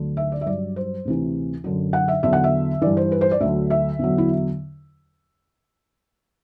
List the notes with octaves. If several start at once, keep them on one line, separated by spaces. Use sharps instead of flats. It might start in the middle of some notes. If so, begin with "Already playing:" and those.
Already playing: D2 D3 F#3
E5
D5
E5
G2 F#3 D5
C5
D2 C3 E3
F#2 D3 F#3
F#5
E5
E2 D3 F#3 E5
F#5
E5
G2 E3 D5
C5
B4
C5
D5
D2 D3 F#3 E5
E5
E2 D3 F#3
E4